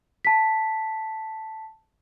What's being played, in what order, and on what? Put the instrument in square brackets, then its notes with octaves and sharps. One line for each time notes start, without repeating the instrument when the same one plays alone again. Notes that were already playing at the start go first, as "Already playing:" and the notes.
[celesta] A5 B6